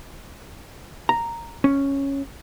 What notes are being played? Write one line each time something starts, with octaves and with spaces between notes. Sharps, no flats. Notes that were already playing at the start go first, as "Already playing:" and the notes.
A#5
C#4